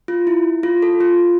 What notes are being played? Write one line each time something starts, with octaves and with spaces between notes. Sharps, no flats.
F4
E4
F4
A4
F4